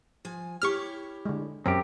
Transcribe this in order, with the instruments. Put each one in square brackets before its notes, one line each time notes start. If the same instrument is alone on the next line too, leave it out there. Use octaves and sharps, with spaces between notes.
[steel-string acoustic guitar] F3 G#5
[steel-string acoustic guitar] E4 G4 C#5 [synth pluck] C#6 F6
[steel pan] D3 G#3
[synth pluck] F#2 [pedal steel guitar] C4 G4